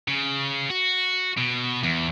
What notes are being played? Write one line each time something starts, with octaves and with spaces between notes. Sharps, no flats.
C#3
F#4
B2
E2